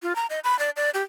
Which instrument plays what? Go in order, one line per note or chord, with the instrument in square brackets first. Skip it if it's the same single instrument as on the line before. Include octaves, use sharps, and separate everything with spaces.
[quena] F4
A#5
D#5
B5
D5
D5
G4